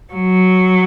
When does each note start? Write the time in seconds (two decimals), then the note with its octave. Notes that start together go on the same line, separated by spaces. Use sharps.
0.13 F#3